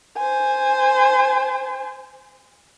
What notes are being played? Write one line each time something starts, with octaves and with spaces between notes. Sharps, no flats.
C5 G#5